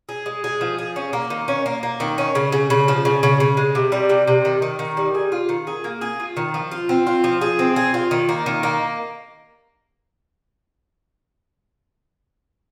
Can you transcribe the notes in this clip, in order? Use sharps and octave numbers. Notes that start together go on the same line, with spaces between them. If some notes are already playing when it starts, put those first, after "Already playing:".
G#4
G#3
G#4
F3
G#4
C#4
A#3
D#3
C#4
A#3
A#3
D#3
C#4
C#3
C#3
C#3
F3
C#3
C#3
C#3
G#3
C3
G3
C3
C3
D#3
D#3
D#3
G3
G#4
F4
D#3
G#4
A#3
G#4
F4
D#3
F3
F4
C4
F4
F3
G#4
C4
G#4
F4
D#3
A#3
D#3
A#3